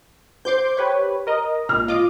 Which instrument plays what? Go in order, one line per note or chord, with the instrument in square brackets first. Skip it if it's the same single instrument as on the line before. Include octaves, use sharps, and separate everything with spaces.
[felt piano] C5 [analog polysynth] C6 D6 G6
[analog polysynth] G4 B4 C#5
A#4 D#5
[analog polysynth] G#1 A#2 [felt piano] F6
[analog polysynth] F4 D#5 D6